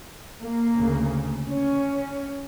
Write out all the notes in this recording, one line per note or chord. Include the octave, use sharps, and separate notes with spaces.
A#3
D2 C#3
C#4